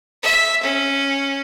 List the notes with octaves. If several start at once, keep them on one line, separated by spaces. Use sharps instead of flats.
E5
C#4